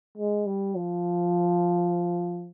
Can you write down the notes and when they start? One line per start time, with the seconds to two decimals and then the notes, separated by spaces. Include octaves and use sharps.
0.18 G#3
0.46 G3
0.75 F3